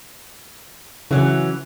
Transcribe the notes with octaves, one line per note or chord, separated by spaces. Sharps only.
C#3 E3 F#3 C#4